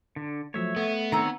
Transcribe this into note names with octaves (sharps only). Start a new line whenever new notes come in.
D3
F3 F#3 A3 C#5 E5
A3 B3
D#3 C4 C#5 A#5